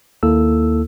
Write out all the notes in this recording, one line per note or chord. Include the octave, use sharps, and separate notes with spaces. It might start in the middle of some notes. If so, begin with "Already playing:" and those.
D#2 A#3 E4 A4 E6